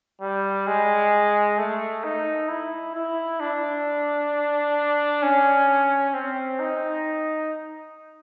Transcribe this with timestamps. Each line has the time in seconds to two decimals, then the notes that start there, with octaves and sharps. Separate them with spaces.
0.21 G3
0.67 G#3
1.58 A3
2.04 D#4
2.49 E4
2.95 E4
3.40 D4
5.23 C#4
6.14 C4
6.59 D#4